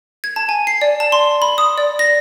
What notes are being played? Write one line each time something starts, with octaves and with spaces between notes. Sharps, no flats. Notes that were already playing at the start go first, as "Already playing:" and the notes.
G#6
A5
G#5
C7
D5
A5
C6
B5
D#6
D5
A#6